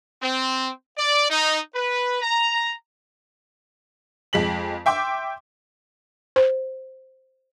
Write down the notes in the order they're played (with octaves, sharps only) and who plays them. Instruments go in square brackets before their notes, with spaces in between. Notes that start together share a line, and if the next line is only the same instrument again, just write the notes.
[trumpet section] C4
D5
D#4
B4
A#5
[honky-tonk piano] F2 G#3 B6 F#7
E5 G5 C6 D6
[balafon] C5